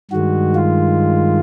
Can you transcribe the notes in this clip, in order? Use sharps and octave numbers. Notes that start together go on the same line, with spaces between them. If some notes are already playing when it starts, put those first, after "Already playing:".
G2 D#3 G#3 F#4
F4